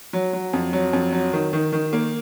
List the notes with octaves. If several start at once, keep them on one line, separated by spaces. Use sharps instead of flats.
F#3
F#3
F2
F#3
F2
F#3
D#3
D#3
D#3
A#3